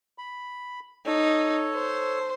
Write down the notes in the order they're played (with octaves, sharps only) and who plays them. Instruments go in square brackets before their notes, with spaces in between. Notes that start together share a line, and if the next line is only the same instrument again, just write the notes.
[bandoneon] B5
[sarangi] D#4 [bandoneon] A4 C#5
[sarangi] C5